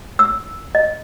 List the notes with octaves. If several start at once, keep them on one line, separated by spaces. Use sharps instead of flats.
E6
D#5